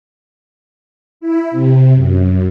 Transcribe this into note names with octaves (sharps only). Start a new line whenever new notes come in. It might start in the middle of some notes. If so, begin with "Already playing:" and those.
E4
C3
F#2